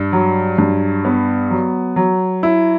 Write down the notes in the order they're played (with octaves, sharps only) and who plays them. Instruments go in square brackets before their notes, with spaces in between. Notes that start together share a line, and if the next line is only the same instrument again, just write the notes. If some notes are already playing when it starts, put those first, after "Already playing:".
Already playing: [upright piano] G2
F#3
G2
B3
F#3
F#3
E4